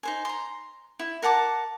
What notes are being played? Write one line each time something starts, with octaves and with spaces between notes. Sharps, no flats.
D#4 C5 G#5
A#5 C6
E4
A#4 F#5 A5 D6